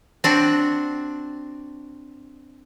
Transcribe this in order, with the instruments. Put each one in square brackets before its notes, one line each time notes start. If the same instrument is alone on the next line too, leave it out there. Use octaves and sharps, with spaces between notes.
[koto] C4 D4 F#4